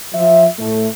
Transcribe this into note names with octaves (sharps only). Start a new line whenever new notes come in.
F3 E5
A2 A3